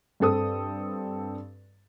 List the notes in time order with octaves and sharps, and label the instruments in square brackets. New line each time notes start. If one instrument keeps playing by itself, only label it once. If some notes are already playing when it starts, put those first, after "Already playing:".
[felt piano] G2 C4 A4 D#6